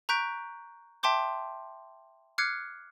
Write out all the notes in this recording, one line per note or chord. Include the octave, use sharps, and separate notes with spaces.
A#5 C#6 F#6 G6 B6 D7
E5 G5 A5 C6 D6 G6
D6 F6 F#6 G#6 C7 C#7